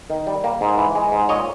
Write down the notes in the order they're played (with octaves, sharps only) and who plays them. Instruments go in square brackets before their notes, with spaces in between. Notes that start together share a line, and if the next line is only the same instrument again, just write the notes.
[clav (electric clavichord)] D#3
G3
A#3
G#2
E3
G#3
G#2
A#2 C#5 D#5